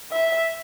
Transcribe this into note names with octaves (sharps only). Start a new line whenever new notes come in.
E5